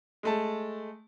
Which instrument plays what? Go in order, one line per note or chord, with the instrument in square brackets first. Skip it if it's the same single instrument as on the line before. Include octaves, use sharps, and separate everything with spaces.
[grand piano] G#3 A3 A5